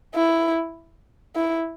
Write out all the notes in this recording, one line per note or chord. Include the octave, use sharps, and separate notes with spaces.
E4
E4